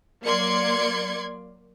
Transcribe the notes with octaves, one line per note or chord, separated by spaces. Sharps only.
F#3 A#3 D5 C6 G#6 C#7